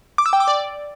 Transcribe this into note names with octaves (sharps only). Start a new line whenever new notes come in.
D6
E6
G5
D6
D5